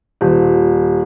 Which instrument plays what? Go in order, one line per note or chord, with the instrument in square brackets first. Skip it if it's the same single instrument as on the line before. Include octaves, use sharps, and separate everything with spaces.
[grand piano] D#1